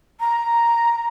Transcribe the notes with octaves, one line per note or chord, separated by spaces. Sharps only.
A#5